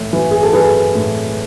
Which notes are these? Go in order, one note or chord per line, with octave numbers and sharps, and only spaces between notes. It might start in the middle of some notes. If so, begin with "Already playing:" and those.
Already playing: A2 E3
E3
G#4
A4
E3 G#4 B4
A2